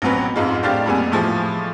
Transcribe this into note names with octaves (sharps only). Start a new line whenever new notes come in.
A1 B2 F#3 C4 C#4 B4
F2 G#2 G#3 D#4 F4
A2 C4 D4 G4 F5 A6
F2 A#2 G3 G#3 B3 G#5
A2 E3 F3 G#3